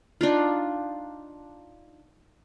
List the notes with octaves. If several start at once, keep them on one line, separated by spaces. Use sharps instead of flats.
D4 D#4 F4